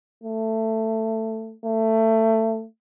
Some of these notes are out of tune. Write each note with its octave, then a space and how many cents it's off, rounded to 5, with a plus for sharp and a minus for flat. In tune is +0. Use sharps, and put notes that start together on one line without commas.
A3 +15
A3 +20